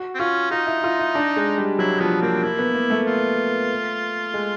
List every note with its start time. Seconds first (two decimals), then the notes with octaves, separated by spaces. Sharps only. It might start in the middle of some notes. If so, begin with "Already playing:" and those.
Already playing: F#4
0.15 C4
0.20 C#4 F4
0.51 D#4 F4
0.67 E4
0.84 F4
0.99 E4
1.15 D4
1.37 G#3
1.58 G3
1.79 F#3 E4
2.00 F3 B3
2.22 A#3 C4
2.43 A#3 E4
2.59 B3
2.75 A#3
2.90 A3
3.07 F4
4.34 G#3